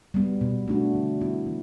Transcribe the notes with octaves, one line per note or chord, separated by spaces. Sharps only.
G3 B3
B2
A3 D4 F#4
D3
G3 B3 E4
E3